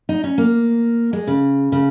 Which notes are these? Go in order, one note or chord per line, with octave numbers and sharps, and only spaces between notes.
D#4
C#4
A#3
G#3
C#3
C#3